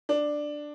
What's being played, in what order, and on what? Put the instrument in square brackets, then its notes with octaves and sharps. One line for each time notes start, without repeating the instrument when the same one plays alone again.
[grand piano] D4